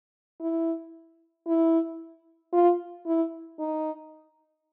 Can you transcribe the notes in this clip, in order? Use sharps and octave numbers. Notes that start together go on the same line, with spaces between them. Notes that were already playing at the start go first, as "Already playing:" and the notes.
E4
E4
F4
E4
D#4